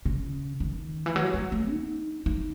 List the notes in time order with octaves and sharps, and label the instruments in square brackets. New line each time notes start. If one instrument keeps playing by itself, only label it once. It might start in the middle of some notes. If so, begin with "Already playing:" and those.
[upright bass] C#3
D#3
E3
F#3
G#3
A3
D#4
D#4